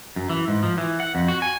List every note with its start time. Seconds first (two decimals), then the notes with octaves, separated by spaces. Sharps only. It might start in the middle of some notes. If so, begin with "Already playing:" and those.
0.16 F#2
0.29 E3
0.48 G#2
0.63 F3
0.78 E3
1.00 F#5
1.15 F2
1.28 F#4
1.42 G#5